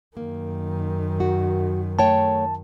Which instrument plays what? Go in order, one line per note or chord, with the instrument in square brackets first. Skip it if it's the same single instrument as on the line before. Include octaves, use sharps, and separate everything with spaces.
[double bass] F#2 D#3 [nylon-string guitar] A#3
[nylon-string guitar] F#4
[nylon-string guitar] A3 C#5 G5 [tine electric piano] A5